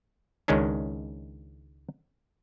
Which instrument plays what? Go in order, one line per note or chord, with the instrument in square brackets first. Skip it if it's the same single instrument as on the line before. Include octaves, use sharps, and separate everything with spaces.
[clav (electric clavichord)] C#2 D#3 G#3 C#4 D4